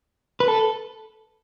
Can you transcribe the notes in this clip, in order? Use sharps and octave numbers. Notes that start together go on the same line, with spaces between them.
B4
A4